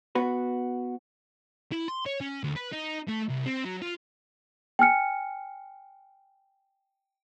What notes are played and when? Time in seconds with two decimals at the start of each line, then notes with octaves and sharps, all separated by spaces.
0.15 B3 F#4 B4
1.72 E4
1.88 C6
2.06 C#5
2.21 C#4
2.44 D2
2.56 B4
2.72 D#4
3.08 A3
3.29 C2
3.46 C4
3.65 F#3
3.82 F4
4.79 G5 G#5 F6 C#7